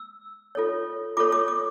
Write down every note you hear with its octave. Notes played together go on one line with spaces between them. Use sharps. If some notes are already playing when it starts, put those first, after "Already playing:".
Already playing: E6
F4 A4 C#5
F4 A4 C#5 D6
D6
D6